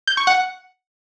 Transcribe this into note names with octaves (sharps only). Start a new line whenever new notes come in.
G6
C#6
F#5